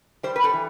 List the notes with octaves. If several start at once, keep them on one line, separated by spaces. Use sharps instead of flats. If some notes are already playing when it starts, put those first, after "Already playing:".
G3 C5
B4
A4
E3